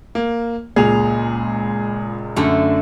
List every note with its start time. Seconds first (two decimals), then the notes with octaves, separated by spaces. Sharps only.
0.15 A#3
0.76 C#2 A#2 G#4 F7
2.36 F#2 D3 A3